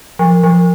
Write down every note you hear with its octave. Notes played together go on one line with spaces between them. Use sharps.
F3
F3